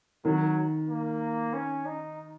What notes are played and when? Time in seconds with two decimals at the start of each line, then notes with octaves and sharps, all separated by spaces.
0.25 D#3 F#3
0.89 A#3
1.54 C#4
1.86 D#4